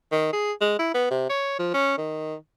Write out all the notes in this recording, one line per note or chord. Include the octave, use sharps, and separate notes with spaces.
D#3
G#4
G#3
E4
B3
C3
C#5
F3
C#4
D#3